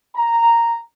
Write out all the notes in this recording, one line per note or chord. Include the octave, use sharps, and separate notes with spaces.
A#5